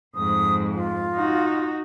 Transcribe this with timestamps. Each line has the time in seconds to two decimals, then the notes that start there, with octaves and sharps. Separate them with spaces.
0.15 F2 G#2 D#6
0.72 F4
1.14 D#4 F#4